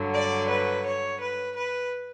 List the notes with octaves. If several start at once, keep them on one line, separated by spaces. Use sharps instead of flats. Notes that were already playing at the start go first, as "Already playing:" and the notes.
Already playing: G2 D3 F#3
D5
B4
C#5
B4
B4